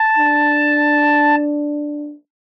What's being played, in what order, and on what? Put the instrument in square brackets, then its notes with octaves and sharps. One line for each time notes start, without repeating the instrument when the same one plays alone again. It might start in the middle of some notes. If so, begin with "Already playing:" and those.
Already playing: [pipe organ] A5
[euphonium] D4